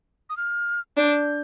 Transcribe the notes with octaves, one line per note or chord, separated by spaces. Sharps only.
D#6
F6
D4 G6